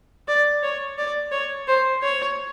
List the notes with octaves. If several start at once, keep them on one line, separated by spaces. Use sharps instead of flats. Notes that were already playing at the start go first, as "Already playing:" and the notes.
D5
C#5
D5
C#5
C5
C#5